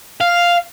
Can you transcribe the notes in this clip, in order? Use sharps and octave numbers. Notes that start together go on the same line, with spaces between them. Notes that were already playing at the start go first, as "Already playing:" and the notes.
F5